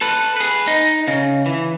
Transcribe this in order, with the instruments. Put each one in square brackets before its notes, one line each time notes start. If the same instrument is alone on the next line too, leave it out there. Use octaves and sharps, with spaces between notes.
[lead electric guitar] A4 B4
G#4 B4
D#4
C#3
E3